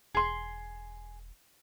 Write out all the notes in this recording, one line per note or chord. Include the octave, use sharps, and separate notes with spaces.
E1 G#4 C6